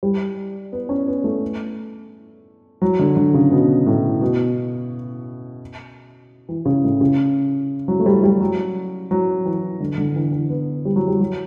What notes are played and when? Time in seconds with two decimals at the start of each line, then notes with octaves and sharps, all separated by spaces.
0.03 G3
0.73 B3
0.89 C#4
1.08 B3
1.24 A3
2.82 F#3
2.99 D3
3.17 D3
3.34 C#3
3.51 B2
3.86 A2
4.21 B2
6.49 E3
6.65 C#3
6.84 A2
7.01 C#3
7.88 F#3
8.00 A3
8.06 G3
8.24 G3
8.40 F#3
9.11 F#3
9.46 E3
9.80 D3
9.98 D3
10.16 E3
10.33 E3
10.50 B3
10.85 G3
10.96 F#3
11.08 G3
11.20 F#3